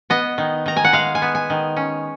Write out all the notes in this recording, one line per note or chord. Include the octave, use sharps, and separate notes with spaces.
B3 D#5
D#3
D#3 A#5
G#5
F#5
G#3 F5
G#5
B3
G#5
D#3
C#4